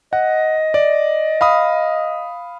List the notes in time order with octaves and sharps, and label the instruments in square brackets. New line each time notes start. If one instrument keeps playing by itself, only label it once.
[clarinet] D#5 [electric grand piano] F#5
[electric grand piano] D5
F5 B5 D#6